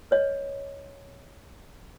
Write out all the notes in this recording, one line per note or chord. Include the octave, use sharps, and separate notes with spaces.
B4 C#5 D#5